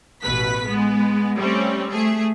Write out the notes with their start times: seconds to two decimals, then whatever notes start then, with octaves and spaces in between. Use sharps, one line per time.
0.22 A1 B2 B4 B6
0.68 G#3 B3
1.37 G3 A3 C4 C#4
1.90 A3 G#4